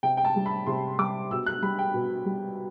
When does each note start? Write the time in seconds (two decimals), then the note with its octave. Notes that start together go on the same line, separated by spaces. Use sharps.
0.03 C3 G5
0.17 G5
0.25 A5
0.36 G3
0.46 B5
0.67 C3 C6
0.98 G3 D6
1.31 B2 E6
1.46 F#6
1.62 G3 B5
1.79 G5
1.94 B2
2.25 G3